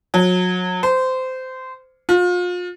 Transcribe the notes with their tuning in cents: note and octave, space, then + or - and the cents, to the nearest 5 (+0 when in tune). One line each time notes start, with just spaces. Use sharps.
F#3 -30
C5 -20
F4 +35